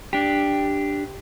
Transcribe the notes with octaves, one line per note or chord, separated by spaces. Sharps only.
D4 G4